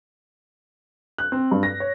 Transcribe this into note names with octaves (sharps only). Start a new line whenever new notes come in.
F#6
C4
G2
A#6
C#5